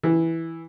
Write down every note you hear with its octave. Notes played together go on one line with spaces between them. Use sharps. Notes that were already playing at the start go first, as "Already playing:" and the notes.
E3